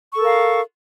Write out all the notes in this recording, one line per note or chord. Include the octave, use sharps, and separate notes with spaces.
A4 A#4 F5 C#6